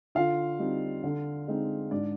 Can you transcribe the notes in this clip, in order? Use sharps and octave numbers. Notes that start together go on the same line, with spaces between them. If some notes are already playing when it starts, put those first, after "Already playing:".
D3 F4 F5
G3 C4 D#4
D3
G#3 C4 D#4
G#2 D4 D5